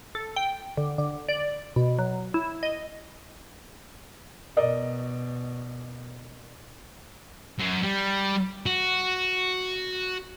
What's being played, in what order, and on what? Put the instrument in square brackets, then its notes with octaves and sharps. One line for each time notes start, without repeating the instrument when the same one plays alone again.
[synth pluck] A4
G5
D3
D3
D5
B2
F#3
E4
D#5
[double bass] B2 [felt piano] A#4 D5 D#5
[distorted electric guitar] F#2
G3
F#4